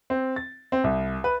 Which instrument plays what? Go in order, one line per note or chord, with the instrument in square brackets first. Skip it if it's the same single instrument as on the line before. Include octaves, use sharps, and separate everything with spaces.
[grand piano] C4
A6
C4
C2
B4